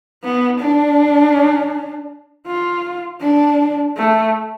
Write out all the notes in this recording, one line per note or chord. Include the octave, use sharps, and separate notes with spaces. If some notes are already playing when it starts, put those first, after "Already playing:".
B3
D4
F4
D4
A3